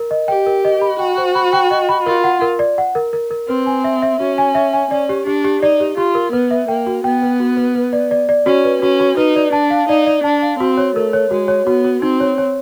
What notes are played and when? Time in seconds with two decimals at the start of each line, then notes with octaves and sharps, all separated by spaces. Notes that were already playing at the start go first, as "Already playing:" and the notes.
Already playing: A#4
0.11 D#5
0.28 G4 G5
0.46 A#4
0.65 D#5
0.81 B5
0.99 F#4 G5
1.18 C5
1.35 B5
1.53 G5
1.71 D#5
1.89 B5
2.06 F4 A#4
2.24 F#5
2.41 A#4
2.59 D5
2.78 F#5
2.95 A#4
3.13 A#4
3.31 A#4
3.48 C4 B4
3.66 G#5
3.84 E5
4.02 E5
4.20 C#4 F#4
4.38 G#5
4.55 E5
4.73 G#5
4.91 C#4 D5
5.09 G4
5.26 D4 G4
5.44 G4
5.62 D#4 D5
5.80 G4
5.97 F4 G4
6.15 A#4
6.32 B3 B4
6.51 E5
6.68 A#3 G5
6.87 F#4
7.04 B3 G5
7.22 B4
7.40 F#4
7.57 B4
7.75 B4
7.93 D5
8.11 D5
8.29 D5
8.46 C#4 F#4
8.65 B4
8.82 C#4 F#4
9.00 F#4
9.17 D#4 B4
9.36 D5
9.53 D4 A5
9.70 F5
9.89 D#4 D5
10.07 D5
10.24 D4 A5
10.42 F5
10.59 C4 F#4
10.77 C#5
10.96 A3 A#4
11.13 C#5
11.31 G#3 F#4
11.48 C#5
11.67 B3 F#4
11.84 F#4
12.02 C4 D#4
12.20 C#5
12.38 C#5